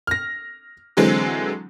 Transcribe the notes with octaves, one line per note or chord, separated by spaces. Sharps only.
F6 A#6
D3 E3 F#3 G#3 C4